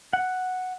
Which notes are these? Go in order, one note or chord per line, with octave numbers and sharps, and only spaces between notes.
F#5